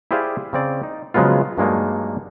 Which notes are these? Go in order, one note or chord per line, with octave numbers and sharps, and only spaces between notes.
E4 G4 G#4 C5 D5 F5
C#3 C4 D5
D#4
C#3 F3 F#3 G#3 B3 F4
G2 F#3 G#3 A#3 D4 D#4